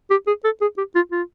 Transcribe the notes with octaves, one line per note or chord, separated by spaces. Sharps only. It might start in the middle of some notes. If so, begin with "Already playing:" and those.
G4
G#4
A4
G#4
G4
F4
F4